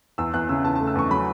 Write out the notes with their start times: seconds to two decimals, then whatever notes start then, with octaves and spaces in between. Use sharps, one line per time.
0.18 E2 E6
0.34 E2 F#6
0.49 C#3 E6
0.64 E2 A5
0.75 A3 A5
0.87 E6
0.95 E2 C#6
1.10 F#3 B5